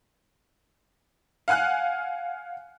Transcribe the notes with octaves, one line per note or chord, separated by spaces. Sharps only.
F5 F#5 G#5 F6 F#6